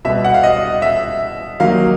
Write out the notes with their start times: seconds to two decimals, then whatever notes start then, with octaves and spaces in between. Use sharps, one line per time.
0.05 B2 G3 B3 E5
0.24 F#5
0.34 F5
0.43 D#5
0.82 E5
1.60 D#3 F#3 A#3 D#4 F5